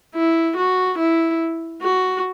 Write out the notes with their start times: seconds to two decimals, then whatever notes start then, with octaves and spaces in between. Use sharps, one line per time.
0.15 E4
0.56 F#4
0.98 E4
1.82 F#4